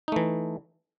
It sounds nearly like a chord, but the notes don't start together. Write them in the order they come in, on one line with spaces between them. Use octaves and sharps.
D#4 A3 E3